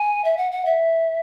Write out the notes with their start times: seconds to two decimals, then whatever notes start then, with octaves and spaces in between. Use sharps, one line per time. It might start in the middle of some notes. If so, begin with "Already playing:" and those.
Already playing: G#5
0.24 E5
0.37 F#5
0.52 F#5
0.65 E5